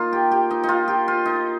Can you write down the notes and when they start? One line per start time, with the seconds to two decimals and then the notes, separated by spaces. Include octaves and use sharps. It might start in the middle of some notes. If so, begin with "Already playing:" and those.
Already playing: A#3 D#4 F4
0.13 G4
0.32 G4
0.51 D#4
0.64 D#4
0.69 F4
0.88 G4
1.08 F4
1.26 D#4